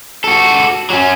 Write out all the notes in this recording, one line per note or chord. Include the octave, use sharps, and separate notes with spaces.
F#4 A4
F#3 C#4